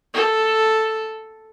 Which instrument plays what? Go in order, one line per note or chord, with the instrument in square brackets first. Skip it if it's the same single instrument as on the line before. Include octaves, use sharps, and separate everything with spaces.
[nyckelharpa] A4